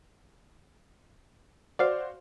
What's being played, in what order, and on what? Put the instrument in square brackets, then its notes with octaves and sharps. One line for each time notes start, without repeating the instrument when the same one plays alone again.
[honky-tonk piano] F#4 C5 [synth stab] D5 F5